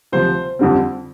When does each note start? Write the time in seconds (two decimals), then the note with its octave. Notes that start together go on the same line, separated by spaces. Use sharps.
0.12 D2 C3 F3 C5
0.59 F2 D3 G3 C4